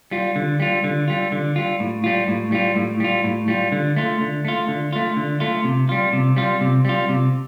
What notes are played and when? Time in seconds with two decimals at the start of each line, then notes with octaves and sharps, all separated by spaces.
0.11 G3 F4
0.36 D3
0.60 G3 F4
0.84 D3
1.08 G3 F4
1.32 D3
1.56 G3 F4
1.80 A2
2.04 G3 F4
2.28 A2
2.52 G3 F4
2.76 A2
3.00 G3 F4
3.24 A2
3.48 G3 F4
3.72 D3
3.96 A3 F4
4.21 D3
4.45 A3 F4
4.68 D3
4.93 A3 F4
5.17 D3
5.40 A3 F4
5.64 C3
5.89 G3 F4
6.13 C3
6.36 G3 F4
6.61 C3
6.85 G3 F4
7.09 C3